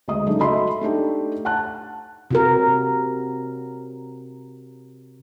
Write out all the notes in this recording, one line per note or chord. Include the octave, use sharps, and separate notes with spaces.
D2 G#3 D#5 D#6
C#3 F#3 A3 D4 D#4
F#4 A4 D#5 E5 B5 C6
A3 D4 D#4 G4
F#5 A5 F#6
C3 F#4 A#4